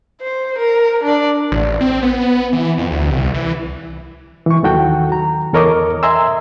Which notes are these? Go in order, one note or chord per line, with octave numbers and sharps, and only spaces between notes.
C5
A#4
D4 D5
A1
C4
B3
E3
F2
D2
C2
E3
E3 C#6
D#2 D#3 F#3 F#4 A4 G5
A#5
E2 A4 A#4 C#5 D#5 D6
D#5 E5 G#5 A#5 C6 E6